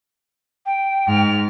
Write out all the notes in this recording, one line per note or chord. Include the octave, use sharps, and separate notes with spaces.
G5
G#2 F6